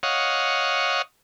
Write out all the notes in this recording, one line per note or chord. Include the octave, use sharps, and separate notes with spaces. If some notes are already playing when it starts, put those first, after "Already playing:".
C#5 D#5 F5 F#5